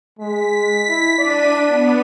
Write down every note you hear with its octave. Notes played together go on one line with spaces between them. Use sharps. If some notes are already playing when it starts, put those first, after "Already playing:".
G#3 B6
E4
D4 D5 D#7
B3